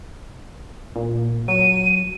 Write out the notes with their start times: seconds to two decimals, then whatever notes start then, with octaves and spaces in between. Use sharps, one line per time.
0.96 A#2
1.48 F#3 D#7